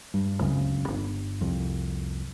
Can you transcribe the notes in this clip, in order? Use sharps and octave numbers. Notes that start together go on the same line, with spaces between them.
G2
D1 C#2 F#2 C#3
G1
C2 F2